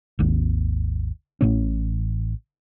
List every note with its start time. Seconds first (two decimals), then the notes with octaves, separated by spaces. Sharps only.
0.19 G#1 D#2
1.41 A1 A2 C#4